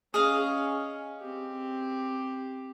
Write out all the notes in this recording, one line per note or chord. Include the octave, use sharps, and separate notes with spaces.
C#4 G#4 D#5 F5
C4 G4